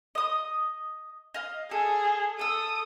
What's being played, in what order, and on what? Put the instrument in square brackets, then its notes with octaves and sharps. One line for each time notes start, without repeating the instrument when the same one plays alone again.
[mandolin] D#5 D#6
D#5 F5
[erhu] G#4 [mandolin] A4
[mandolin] A4 E6 [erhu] D#6